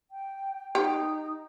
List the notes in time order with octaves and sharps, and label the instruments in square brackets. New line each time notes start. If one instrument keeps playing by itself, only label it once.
[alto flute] G5
[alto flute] D#4 [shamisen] G4